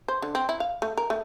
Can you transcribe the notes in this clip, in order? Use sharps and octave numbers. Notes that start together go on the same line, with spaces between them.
C5
D3
C4
E4
F5
A3
A#4
A3